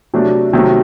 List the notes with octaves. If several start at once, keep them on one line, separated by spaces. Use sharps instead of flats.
C3 F#3 A3 D4
C3 D#3 F#3 A3